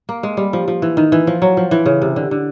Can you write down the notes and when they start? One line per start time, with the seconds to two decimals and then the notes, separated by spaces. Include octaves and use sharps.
0.09 A#3
0.23 G#3
0.37 G3
0.53 F3
0.68 F3
0.82 E3
0.97 D#3
1.12 E3
1.27 F3
1.42 F#3
1.57 F3
1.71 E3
1.86 C#3
2.02 C3
2.16 D3
2.31 D3